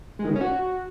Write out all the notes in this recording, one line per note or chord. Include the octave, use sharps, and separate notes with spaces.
G#3
D#3
C#3
C#4
F#4